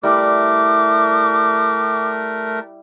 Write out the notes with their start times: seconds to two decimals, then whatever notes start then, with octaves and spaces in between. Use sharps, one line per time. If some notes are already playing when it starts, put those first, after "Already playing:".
0.03 G3 A3 E4 A#4 D6